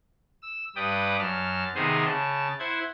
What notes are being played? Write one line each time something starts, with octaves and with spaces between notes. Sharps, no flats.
E6
G2 B4 D5 G5 D#6
F#2 A5 F6
C3 D#3 B3 D#4 G#4 C5
C#3 A5
E4 C5 F#5 G#6